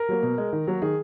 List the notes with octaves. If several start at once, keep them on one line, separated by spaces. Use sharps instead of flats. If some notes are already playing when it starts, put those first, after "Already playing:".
Already playing: A#4
F#3 A#3
B2
G#3
D#3
F#3 A#3
D#3 G#4